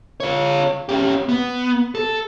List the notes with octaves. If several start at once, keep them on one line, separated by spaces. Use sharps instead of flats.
F4 C#5
C#4 G4
B3
A4